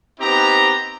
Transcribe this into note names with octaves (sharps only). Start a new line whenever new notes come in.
B3 C4 D#4 G4 A#5